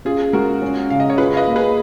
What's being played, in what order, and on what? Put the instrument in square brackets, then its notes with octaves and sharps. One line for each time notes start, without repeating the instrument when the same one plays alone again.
[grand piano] C#4 [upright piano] F4 G#4
[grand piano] G#3 [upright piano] F#4 A#4
[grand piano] C#4
[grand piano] C#3 [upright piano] F5
[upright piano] D#5
C#5
[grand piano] F4 [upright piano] G#4 B4
[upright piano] F5
B4 D#5
[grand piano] A#3
[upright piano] G#4 B4